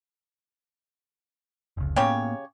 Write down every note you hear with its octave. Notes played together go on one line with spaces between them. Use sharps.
F1 C#2
A2 C#3 A#3 B3 G4 C#5